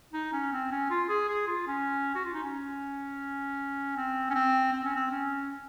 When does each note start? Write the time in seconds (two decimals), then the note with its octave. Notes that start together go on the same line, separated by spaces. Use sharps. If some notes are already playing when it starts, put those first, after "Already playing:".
0.13 D#4
0.32 C#4
0.52 C4
0.71 C#4
0.91 F4
1.09 G#4
1.28 G#4
1.47 F4
1.67 C#4
2.15 F#4
2.24 F4
2.34 D#4
2.44 C#4
3.96 C4
4.30 C#4
4.34 C4
4.73 C4
4.85 C#4
4.96 C4
5.11 C#4